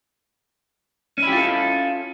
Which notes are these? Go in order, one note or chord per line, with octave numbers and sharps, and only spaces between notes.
C#4 E4 F4 G4 A4